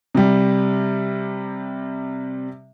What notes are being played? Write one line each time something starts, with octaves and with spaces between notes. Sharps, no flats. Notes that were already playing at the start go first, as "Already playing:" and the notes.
C3 G3